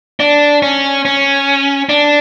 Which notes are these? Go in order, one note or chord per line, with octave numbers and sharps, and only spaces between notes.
D4
C#4
C#4
D4